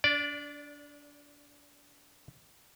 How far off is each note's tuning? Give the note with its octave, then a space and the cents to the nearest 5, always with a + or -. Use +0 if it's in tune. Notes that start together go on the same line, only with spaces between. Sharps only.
D4 -25 D5 +0